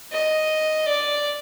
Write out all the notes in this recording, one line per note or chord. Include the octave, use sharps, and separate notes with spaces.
D#5
D5